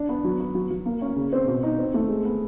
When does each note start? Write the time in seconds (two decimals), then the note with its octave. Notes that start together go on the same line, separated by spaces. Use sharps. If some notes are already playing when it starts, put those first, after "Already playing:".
Already playing: D4
0.09 B3
0.24 F#3
0.40 B3
0.55 F#3
0.70 F#3
0.86 A#3
1.01 C#4
1.16 C#3
1.33 C4
1.48 B2
1.63 D#4
1.79 C4
1.94 A3
2.09 G#3
2.25 B3